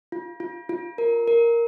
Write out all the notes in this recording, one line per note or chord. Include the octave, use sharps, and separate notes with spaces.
F4
F4
F4
A#4
A#4